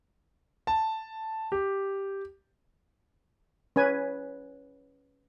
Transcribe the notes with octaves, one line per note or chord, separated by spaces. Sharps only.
A5
G4
C#4 B4 G#5